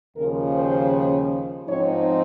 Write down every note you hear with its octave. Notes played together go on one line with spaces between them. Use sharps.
D#2 C#3 F3 A#4
C5
G#2 F3 C4 D#4 C#5